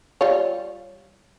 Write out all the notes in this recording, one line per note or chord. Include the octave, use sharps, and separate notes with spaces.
G3 F4 C#5